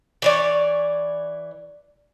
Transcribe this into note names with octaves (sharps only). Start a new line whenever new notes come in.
E3 C#5 D5